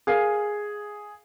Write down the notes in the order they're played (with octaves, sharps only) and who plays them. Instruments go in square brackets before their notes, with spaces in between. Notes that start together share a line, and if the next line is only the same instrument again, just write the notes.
[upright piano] G#4 [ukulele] A#4 F5 G#5